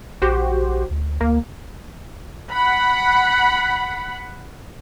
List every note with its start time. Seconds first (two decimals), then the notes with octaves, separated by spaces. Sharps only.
0.22 A#1 F#4 G4 C5
0.91 D2
1.21 D2 A#3
2.52 F#5 B5